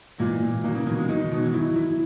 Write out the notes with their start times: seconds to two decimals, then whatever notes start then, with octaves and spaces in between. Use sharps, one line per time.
0.19 A#2 E3 G#3
0.42 A#2
0.64 D#3 F#3 A#3
0.75 C#3 E3
0.86 B2 D#3 F#3
0.98 E3 G#3
1.09 D#3 F#3 D#4
1.20 D#3 F#3
1.31 B2 D#3 F#3
1.43 E3 G#3
1.53 D#3 F#3 E4
1.76 E4